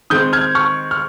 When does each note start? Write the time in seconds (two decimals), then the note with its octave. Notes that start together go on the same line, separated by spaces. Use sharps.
0.10 D#3 G#3 C4 D#6 G6
0.33 F6 G#6
0.55 C#6 F6
0.91 F6